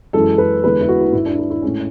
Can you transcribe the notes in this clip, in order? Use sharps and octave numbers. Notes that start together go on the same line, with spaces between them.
F#2 E3 G#3 A4
B4
E2 D3 G#3 B4
E4
F#4
E4
G#2 G#3 E4
D4
E4
E4
A2 G#3 C#4